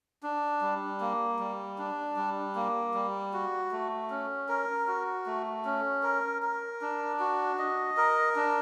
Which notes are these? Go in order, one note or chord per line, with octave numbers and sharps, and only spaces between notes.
D4
G3
A#3
G3
D4
G3
A#3
G3
F#4
A3
C#4
A#4
F#4
A3
C#4
A#4
A#4
D4
F#4
D#5
A#4
D4